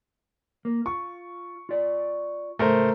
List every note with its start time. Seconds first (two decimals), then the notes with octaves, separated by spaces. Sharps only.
0.65 A#3
0.86 F4 C#6
1.69 F4 D5
2.59 C#2 A2 A3 A#4 C5